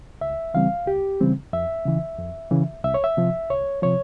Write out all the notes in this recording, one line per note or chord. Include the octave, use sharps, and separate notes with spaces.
C#2 E5
C#3 E3 G3 C4 F5
C#2 G4
C#3 E3 G3 C4
F2 E5
C#3 E3
F2
C#3 E3
C2 E5
C#5
E5
C3 F3
C2 C#5
C3 F3 C#5